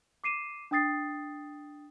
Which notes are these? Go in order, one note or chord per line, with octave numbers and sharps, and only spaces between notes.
D6 C7 D#7 E7
D4 G5 D#6 A6 C7